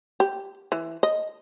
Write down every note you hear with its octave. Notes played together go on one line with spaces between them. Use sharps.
G4
E3
D#5